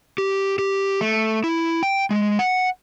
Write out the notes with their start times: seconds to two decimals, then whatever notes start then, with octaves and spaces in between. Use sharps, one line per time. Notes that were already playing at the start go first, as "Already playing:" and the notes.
0.18 G4
0.59 G4
1.01 A3
1.44 E4
1.83 G5
2.11 G#3
2.39 F#5